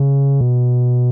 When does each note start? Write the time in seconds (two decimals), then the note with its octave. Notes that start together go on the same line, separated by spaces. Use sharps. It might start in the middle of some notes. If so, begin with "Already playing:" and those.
Already playing: C#3
0.41 B2